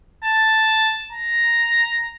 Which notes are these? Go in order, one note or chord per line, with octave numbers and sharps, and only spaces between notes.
A5
A#5